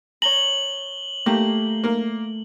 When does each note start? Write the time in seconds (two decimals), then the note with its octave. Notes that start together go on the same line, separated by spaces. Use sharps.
0.22 C#5 A#5 F#7 G7
1.26 A3 A#3 G4 A#5
1.84 A#3 A#4